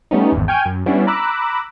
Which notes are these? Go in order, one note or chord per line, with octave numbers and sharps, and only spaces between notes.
G3 A3 B3 C#4 D#4
G#1 E2
G5 G#5 C#6 F6 G6 G#6
F#2
G3 B3 C#4 D4 E4
A#5 B5 D6 E6 F#6